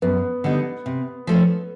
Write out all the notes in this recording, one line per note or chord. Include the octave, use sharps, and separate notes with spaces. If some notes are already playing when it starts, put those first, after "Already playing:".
F#2 B3
D3 G3 B3 D#4
C3
F3 A3 C#4